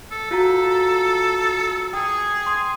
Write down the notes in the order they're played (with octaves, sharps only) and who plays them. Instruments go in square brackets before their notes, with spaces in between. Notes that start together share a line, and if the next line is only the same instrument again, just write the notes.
[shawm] A4
[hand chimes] F4 F#4 A#5 [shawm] A4
[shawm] G#4 [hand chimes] G5 D#6
[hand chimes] C6 D#6